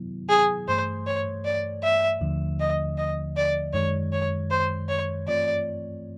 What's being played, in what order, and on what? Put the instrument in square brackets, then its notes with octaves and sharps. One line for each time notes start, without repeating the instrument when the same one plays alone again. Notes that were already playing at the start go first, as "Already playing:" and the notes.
Already playing: [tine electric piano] C3 D#3 F#3 B3 E4
[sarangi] G#4
[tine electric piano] G2 E3 A3 [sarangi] C5
[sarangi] C#5
D5
E5
[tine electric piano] D#2 D3 F3 A3
[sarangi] D#5
D#5
D5
[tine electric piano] F#2 D#3 G#3 [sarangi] C#5
[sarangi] C#5
C5
C#5
[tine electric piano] G2 E3 A3 C4 F4 [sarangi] D5